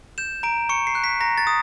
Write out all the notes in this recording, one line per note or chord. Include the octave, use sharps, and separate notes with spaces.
G6 E7
A#5 D7
C#6 C#7
C7
F#6
B6
A#5 A#6
A6
D#6